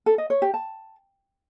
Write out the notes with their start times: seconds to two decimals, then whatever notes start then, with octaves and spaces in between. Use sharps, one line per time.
0.06 A4
0.18 D#5
0.30 C#5
0.42 G4
0.54 A5